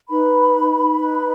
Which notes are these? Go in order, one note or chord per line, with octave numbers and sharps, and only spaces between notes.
D#4 B4 B5
D#4 B4